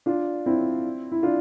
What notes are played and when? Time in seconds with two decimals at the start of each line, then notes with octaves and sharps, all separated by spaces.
0.06 D4 F4
0.46 C4 E4
1.12 E4
1.23 D4 F4